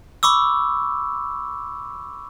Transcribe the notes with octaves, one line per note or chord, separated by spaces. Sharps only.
B5 C#6 D6 E6